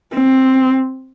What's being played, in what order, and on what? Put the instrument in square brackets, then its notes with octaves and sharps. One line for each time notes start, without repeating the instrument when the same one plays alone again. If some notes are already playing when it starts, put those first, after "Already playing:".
[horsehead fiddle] C4